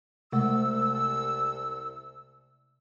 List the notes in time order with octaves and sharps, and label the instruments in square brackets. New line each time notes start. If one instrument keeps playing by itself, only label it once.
[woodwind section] C2 E6 [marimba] C3 G#3 A3